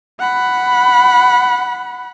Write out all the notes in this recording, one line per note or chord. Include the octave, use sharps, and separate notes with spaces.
F#5 B5